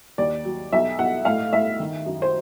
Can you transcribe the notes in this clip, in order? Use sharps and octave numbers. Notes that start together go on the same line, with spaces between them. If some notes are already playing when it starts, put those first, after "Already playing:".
D#2 D5
F#3
B1 E5
B1 F#5
A2 F5
A2 E5
D#3
F#2
C5